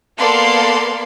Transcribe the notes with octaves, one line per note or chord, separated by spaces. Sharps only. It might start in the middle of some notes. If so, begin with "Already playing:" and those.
A#3 B3 A4 D5 F5 C6